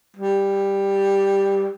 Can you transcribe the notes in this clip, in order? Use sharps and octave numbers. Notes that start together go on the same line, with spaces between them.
G3